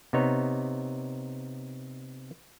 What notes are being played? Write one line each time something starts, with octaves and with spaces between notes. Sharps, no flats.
C3 B3 D#4 C#5